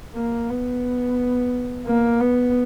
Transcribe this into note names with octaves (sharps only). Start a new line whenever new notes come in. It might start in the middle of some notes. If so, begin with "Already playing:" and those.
A#3
B3
A#3
B3